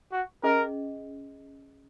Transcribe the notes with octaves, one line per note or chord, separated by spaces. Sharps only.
F#4
C#4 G#4 A#4 D#5